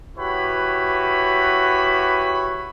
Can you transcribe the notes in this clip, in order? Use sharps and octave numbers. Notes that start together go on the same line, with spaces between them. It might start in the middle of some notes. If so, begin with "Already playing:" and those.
E4 F#4 G4 B4 C#5 B5